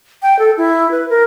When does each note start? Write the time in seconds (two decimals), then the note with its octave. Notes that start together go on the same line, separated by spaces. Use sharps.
0.22 G5
0.39 A4
0.57 E4
0.91 B4
1.09 A#4